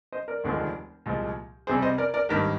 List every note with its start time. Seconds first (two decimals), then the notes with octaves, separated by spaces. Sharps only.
0.12 C5 D#5
0.28 A#4 D5
0.44 F1 D#2 D3 F3 G#3
1.06 C2 A#2 F3 G#3
1.67 F2 C3 G3 G#4 C5
1.82 C5 D#5
1.98 A#4 D5
2.14 A#4 D5
2.29 G#1 G2 D#3 G4 A#4